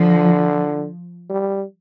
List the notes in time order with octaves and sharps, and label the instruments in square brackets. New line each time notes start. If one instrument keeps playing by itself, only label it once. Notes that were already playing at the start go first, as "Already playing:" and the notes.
Already playing: [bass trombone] D3 [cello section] F3
[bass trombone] G3